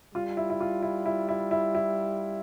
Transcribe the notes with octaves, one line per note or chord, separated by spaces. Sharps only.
G3 F4
E4
E4
F4
E4
E4
E4
E4
E4